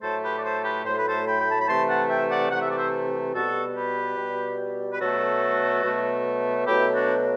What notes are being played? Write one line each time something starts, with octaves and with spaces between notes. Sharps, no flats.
A2 F#3 A3 A4 C5
G4 B4
D5
A4 C5
G4 B4
A2 F#3 A3 C5
B4
A4 C5
G5 B5
G5
A5
B5
C3 E3 A3 A5 C6
F#5 A5
E5 G5
D5 F#5
C3 E3 A3 F#5
E5
D5
C5 E5
B2 G3 F#4 A4
G4 B4
B2 G3
B4
B2 F#3 A3 F#4 A4
B2 F#3 A3
B2 F#3 A3 E4 G4
D4 F#4